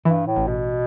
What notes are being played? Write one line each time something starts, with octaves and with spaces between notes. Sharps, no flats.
G2 E3
A2
A1
B2